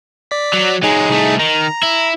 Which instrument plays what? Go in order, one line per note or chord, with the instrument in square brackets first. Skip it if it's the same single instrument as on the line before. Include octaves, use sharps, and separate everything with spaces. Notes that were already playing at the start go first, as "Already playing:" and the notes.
[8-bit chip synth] D5 B6
[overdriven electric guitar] F#3
[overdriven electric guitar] F#3 G#3 [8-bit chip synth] D#4 G#4
[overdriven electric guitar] C2 A3
[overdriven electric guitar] D#3 [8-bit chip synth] A#5
[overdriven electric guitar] E4